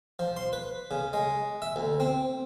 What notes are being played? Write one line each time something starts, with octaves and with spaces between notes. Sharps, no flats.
F3
C6
B4
C#3
G#3
E5
D2
C4